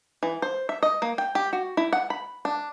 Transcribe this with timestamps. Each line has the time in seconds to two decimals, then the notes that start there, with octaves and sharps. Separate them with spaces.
0.23 E3
0.42 C5
0.69 E5
0.83 D#5
1.02 A#3
1.18 G5
1.35 G4
1.53 F#4
1.77 E4
1.93 F#5
2.10 B5
2.45 D4